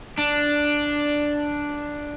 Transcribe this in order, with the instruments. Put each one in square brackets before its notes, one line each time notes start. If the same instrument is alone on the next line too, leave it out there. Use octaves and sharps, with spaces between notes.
[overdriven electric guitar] D4